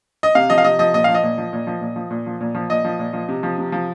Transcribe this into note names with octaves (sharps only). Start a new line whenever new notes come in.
D#5
C3 F5
F3 D#5
F5
C3 D#5
F3 D#5
A#2 D#5
F3 F5
D#5
A#2
F3
A#2
F3
A#2
F3
A#2
F3
A#2
F3
A#2 D#5
F3
A#2
F3
C3
F3
C3
F3